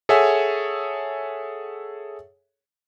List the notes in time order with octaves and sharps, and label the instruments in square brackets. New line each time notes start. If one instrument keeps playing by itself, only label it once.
[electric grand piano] G#4 A4 C#5 E5 F#5 G#5